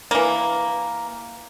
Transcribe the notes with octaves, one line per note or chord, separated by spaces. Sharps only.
E3 A#3